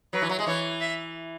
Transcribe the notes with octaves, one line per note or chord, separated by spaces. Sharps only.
F#3 B4
E3
F#3
G#3
E3 C#5
E5